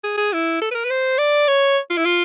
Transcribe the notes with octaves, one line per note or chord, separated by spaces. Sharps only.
G#4
G#4
E4
A4
B4
A#4
B4
C5
D5
C#5
F4
E4
F4